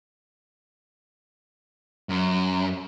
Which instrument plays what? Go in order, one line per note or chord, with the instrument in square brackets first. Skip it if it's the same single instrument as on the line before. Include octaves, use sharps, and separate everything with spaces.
[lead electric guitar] F#2